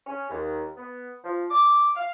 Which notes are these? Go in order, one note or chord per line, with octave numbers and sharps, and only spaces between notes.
C#4
D#2
B3
F3
D6
F5